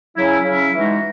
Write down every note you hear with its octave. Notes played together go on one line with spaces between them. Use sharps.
C#3 F#3 C#4 E4
C#3 F#3 C#4 E4
E3 G#3 D#4 F#4